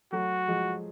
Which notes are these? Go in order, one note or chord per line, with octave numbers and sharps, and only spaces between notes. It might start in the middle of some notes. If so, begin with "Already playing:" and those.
F#3 A3 F#4
F3 G#3